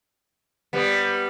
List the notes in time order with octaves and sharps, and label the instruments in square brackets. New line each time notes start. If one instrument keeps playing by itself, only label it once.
[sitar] G3 B3